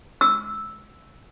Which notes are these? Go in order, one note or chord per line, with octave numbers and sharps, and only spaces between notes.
E6